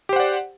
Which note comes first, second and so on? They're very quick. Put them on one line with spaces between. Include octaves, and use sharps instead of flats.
G4 C5 F#5 D5